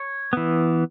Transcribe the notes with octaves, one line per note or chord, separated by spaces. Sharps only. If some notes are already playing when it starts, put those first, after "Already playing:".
Already playing: C#5
E3 B3